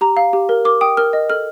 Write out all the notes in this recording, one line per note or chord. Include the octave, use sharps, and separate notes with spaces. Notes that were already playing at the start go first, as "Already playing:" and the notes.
G4 A#5
F5
G4
A#4
A#4 D6
G5 D#6
A#4 F6
D#5
A4 F6